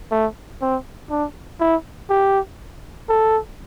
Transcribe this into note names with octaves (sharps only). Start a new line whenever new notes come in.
A3
C4
D4
E4
G4
A4